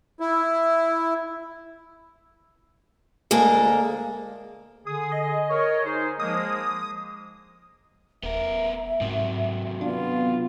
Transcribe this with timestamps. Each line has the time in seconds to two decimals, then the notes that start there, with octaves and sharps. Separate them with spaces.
0.20 E4
3.31 D2 G#3 A#3 A4 A#4
4.87 D3 G#4 D#6
5.12 D#5
5.50 A#4 C#5
5.85 D#4 G#4 C5
6.20 F3 G#3 A#3 D#6
8.23 D#1 B3 A#4 E5
9.01 G#2 C3 F#3
9.81 B3 D4 F4